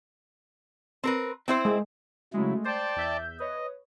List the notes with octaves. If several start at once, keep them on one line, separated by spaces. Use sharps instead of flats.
C4 A#4 B4
C4 E4 C5
G#3
C#3 F#3 G#3 A3 E4
C5 D5 G5 A5 A6
E2 E5 G6
B4 C#5 D#5